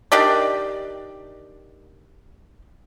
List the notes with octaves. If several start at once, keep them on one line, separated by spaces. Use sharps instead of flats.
D#3 D4 G4 D5